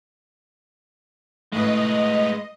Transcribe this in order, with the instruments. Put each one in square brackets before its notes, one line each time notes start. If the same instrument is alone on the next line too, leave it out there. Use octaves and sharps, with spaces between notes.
[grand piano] A2 [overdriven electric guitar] G#3 B4 [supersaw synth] D#5